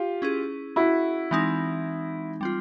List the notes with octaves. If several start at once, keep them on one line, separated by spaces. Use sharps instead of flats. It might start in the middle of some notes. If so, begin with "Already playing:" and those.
Already playing: F4 G4
C#4 E4 G#4
E4 F#4
E3 G#3 C4 D#4
G3 C4 F4